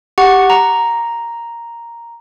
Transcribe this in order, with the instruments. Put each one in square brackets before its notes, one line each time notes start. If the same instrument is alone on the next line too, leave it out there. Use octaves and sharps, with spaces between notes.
[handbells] G4 F#5 C#6
A#5